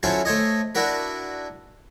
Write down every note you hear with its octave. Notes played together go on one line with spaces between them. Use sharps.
F#3 C#4 E4 F4 A4 C5
A3 C5 C#5 D#5
D4 E4 F#4 A#4 B4